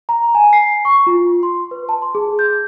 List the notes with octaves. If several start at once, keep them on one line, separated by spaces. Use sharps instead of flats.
A#5
G#5
C7
C#6
F4
C6
B4
A5
C6
G#4
G6